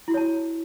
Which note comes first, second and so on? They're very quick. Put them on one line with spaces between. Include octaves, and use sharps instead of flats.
E4 F#4 C#5 A5